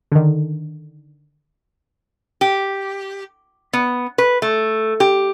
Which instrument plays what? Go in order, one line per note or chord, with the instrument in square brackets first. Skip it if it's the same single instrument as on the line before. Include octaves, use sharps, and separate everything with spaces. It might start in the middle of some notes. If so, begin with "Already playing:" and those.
[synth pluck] D3 D#3
[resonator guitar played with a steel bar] G4
B3
B4
A3
G4